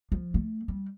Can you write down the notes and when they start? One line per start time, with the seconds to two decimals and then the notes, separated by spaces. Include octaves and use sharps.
0.12 F3
0.34 A3
0.68 G3